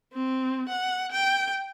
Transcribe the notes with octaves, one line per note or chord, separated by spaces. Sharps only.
C4
F#5
G5